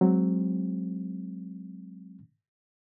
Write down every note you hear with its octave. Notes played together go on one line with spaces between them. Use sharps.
F#3 G#3 C4